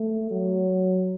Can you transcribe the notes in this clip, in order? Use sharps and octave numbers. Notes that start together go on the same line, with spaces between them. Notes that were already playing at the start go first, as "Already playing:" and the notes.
Already playing: A3
F#3